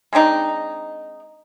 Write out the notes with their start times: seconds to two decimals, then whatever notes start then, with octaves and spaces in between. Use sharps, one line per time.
0.13 G#3 C4 D4 D#4